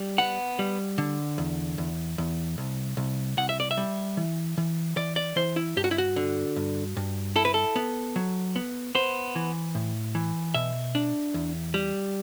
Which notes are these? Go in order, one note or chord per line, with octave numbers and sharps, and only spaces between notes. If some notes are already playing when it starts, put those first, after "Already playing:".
Already playing: G3
B3 F#5
G3
D3
E2
E2
E2
C2
C2
C2 F#5
E5
D5
E5
G3
E3
E3
E3 D5
D5
E3 C5
E4
G2 G4
F#4
E4
F#4
D3
G2
G2
E4 A4
B4
A4
B3
F#3
B3
B3 C5
E3
A2
E3
B2 E5
D4
E2
G3